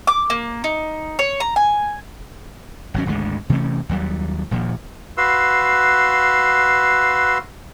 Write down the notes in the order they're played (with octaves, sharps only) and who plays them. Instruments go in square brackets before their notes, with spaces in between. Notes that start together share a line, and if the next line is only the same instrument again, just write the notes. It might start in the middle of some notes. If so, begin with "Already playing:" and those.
[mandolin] D6
A#3
D#4
C#5
A#5
G#5
[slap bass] G#1 F#3 C#4
G#1 D2 D3 G#3
C3 E3 A3 C#4
D#2 F#3 G3
D#1 A#2 F3
[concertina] F#4 B4 F5 C6 E6